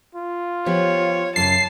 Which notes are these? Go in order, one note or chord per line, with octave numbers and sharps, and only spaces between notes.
F4
F3 B3 G4 C#5
F#2 A2 C#3 A5 C7